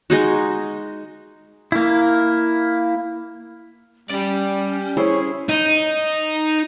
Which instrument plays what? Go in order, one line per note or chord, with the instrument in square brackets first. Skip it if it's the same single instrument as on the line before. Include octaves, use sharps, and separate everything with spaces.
[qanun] G#3 D#4 F#4
[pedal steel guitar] A#3 E4
[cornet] G3 [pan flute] C#4 [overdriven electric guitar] G4 D5
[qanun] E4 G#4 C5 [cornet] C#5
[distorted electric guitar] D#4